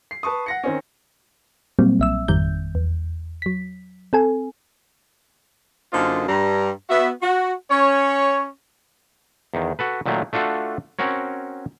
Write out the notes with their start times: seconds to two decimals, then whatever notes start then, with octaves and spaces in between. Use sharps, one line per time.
0.11 C7
0.23 B4 A5 C#6 D#6
0.46 F#5 A#6 C#7
0.63 D#3 C4 C#4
1.79 A#2 F#3 G3 A#3 C4
1.99 B1 E5 E6
2.28 G#1 F2 D#3 G3 G6
2.75 E2
3.42 F#3 B6
4.13 C4 A4 G#5
5.93 F#2 D3 A#3 D#4 F4 C5
6.29 G2 G3 A#5
6.90 B3 F#4 E5
7.23 F#4
7.71 C#4 C#5
9.54 E2 D#3
9.79 F#4 A4 B4
10.06 A#2 D#3 F#3 A3 A#3
10.33 A3 D4 F4 F#4 A4
10.99 C4 C#4 F#4 A#4 C#5